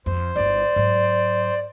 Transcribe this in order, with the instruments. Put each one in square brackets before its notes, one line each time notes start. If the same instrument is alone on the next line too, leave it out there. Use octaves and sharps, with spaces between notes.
[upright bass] F2 [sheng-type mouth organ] C5
[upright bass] G1 E4 [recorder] D5
[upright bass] G#2 F#3